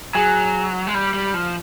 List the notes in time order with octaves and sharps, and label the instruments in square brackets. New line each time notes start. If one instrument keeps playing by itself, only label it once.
[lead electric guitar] F#3 [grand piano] G#4
[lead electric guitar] G#3
G3
G3
F3